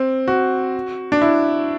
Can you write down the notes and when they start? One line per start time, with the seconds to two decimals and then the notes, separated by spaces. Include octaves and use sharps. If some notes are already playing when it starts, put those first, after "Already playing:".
Already playing: C4
0.28 F#4
1.12 D4
1.22 E4